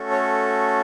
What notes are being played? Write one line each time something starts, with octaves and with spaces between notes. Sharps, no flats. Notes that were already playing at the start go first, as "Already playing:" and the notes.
Already playing: A3 C#4 F#4 A4
C#5